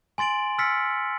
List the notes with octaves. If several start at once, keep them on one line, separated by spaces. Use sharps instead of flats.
G#5 C6 A6 D7 F#7
E6 F6 A6 B6 C#7